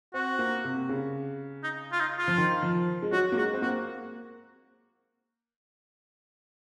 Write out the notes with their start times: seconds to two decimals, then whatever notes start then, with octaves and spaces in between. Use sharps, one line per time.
0.14 C4 F#4
0.39 A#3
0.64 C3
0.89 C#3
1.64 D#4
1.92 F4
2.00 D#4
2.19 F4
2.28 F3
2.38 D#3
2.62 F3
3.03 G#3
3.12 F#3 F#4
3.32 A#3
3.37 G#3 F#4
3.53 C4
3.62 A#3 F#4